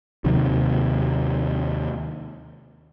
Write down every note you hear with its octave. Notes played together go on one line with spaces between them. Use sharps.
D#2 C3 D#3 F#3